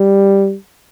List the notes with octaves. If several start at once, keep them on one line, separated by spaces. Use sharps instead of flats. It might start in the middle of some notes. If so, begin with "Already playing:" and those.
Already playing: G3